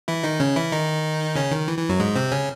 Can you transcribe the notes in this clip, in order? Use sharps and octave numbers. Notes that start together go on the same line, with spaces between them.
E3 E4
D#3 D#4
C#3 C#4
E3 E4
D#3 D#4
C#3 C#4
D#3
E3
E3
F#2 F#3
G#2 G#3
C3 C4
C#3 C#4